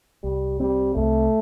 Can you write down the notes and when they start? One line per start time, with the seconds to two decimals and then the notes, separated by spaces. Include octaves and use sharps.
0.23 C2 G3
0.60 G3 C4
0.95 C2 A3